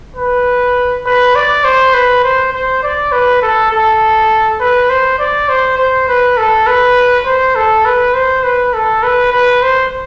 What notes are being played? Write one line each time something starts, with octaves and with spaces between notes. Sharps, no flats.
B4
B4
D5
C5
B4
C5
C5
D5
B4
A4
A4
B4
C5
D5
C5
C5
B4
A4
B4
C5
A4
B4
C5
B4
A4
B4
B4
C5